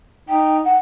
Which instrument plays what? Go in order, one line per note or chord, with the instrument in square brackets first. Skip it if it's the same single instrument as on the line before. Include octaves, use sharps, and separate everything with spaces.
[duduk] D#4 [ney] G5
[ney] F#5